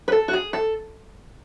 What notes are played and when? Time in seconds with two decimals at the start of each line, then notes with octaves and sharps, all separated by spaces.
0.08 B4
0.12 A4
0.28 F#4
0.33 G#4
0.53 A4